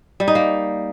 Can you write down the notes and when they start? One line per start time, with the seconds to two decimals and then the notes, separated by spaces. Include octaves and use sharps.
0.20 G3
0.28 D#4
0.35 A#3